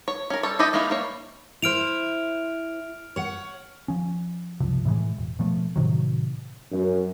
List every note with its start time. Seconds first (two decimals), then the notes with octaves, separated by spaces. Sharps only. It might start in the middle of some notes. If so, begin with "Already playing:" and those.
0.08 C#5
0.30 C#4 A#4
0.43 G3 A4 C#5
0.59 E4 G4 A4 D#5
0.73 G#3 A#3 C#4 D#4 E4
0.90 G3 A#3 C#5
1.62 E4 C5 F6 D7 F7
3.16 C#5 F#5
3.88 F3 C#4
4.60 F#1 C2 C3 F3
4.85 A2 E3 F#3 G#3
5.18 E1
5.39 B2 F3 A3
5.76 A2 C3 D#3 F#3
6.72 F#2